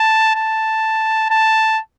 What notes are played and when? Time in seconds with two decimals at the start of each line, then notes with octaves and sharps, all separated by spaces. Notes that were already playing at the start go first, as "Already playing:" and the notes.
Already playing: A5
0.35 A5
1.30 A5